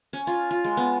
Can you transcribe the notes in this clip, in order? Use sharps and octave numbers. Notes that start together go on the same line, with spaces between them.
C#4
F4
F4
G#3
B3